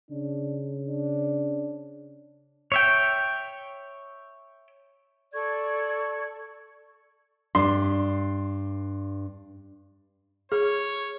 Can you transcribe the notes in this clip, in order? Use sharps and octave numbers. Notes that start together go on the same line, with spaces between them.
C#3 D4
D4
C#5 E5 G5
A4 D5 C#6 G#6
G2 D4 C6
G#4 C#5